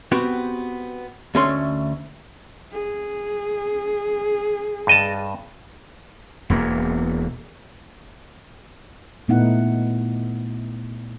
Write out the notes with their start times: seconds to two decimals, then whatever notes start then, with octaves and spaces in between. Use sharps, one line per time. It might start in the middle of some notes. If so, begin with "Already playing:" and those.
0.12 B3 C4 F#4 G4
1.35 D2 A3 C#4 A4 C6
2.72 G#4
4.87 G2 D#5 A5
6.50 E1 E2 A#3
9.28 A#2 A3 B3 D#4 E4 F#5